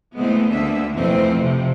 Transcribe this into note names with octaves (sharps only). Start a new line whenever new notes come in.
D3 E3 G#3 A3 B3 C4
D2 D3 A#3 E5
F2 B2 E3 F3 A3 C4
C3 F3